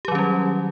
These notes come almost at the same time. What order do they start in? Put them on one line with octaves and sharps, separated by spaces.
G4 F#3 D#3 C#4 G3